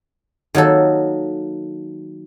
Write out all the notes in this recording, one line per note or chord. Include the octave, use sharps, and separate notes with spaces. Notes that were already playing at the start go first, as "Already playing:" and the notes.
D#3 F#3 A#3 A4